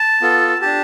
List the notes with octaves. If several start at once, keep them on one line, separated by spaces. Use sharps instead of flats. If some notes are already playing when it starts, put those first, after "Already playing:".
Already playing: A5
B3 F4 A4
D4 G4 A5